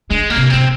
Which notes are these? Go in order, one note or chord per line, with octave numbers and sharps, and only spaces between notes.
D3 G#3
A#3
C3
C3 C4